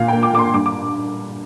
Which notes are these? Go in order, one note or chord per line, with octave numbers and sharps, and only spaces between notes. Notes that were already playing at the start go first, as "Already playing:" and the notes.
Already playing: A#2 F5
A#3 G5
D6
A#3 D6
C6
G2 D6
D6